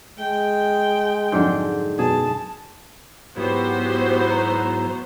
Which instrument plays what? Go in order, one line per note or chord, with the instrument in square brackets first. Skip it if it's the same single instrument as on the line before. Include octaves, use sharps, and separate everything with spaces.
[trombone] G#3 [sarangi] G5
[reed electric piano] F2 F#3 G6 [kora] G#2 D3
[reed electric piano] F#2 B2 F#3 [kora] G#4 [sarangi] A5
[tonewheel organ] G#2 F#3 E4 [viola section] B3 F#4 C5 [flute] G4
[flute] A#5